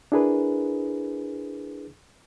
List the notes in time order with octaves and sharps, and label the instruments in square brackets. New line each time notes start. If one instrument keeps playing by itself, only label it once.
[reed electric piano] D4 E4 G#4 A#4 B4